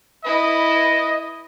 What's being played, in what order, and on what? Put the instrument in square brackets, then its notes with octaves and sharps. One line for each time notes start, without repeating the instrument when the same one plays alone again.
[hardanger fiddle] E4 B4 [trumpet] D#5